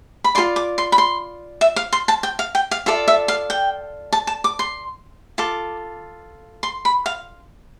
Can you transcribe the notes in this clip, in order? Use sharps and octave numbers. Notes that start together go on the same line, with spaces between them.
B5
F4 A4 D5 C6
D6
C6
B5
C6
E5
F5
C6
A5
G5
F5
G5
F5
F4 A4 D5 E5
E5
F5
G5
A5
A5
D6
C6
F4 A4 D6
C6
B5
F5